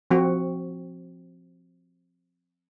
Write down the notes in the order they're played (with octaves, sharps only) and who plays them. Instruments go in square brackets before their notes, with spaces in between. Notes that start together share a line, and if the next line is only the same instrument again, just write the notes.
[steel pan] F3 C4 F#4